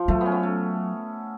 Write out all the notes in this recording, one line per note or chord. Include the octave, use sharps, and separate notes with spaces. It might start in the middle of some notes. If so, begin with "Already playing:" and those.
Already playing: F3 F4
F#3 A3
B3 C#4
B3
A3